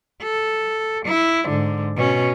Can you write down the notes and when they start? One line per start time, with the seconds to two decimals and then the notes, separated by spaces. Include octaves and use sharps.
0.23 A4
1.06 E4
1.47 G#2 D3
1.97 B2 C#4